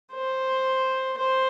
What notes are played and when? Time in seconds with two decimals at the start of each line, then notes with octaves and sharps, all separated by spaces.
0.13 C5
1.18 C5